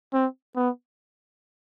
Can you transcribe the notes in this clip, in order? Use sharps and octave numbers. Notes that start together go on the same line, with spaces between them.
C4
B3